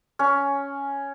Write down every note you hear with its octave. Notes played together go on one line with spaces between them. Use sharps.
C#4